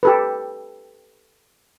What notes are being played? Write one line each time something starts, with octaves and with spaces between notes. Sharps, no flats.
G4 A4 B4